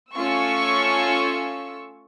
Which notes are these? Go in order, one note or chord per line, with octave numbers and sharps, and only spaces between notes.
A3 C#4 F4 C#6 E6